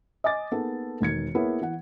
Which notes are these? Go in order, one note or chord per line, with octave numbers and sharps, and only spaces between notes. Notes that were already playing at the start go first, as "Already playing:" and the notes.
D#5 G#5 D6 A6
A#3 B3 D#4 G#4 A4
E1 D#3 G#6 C#7
A#3 B3 E4 G#4 B4 C#5
E3 F#5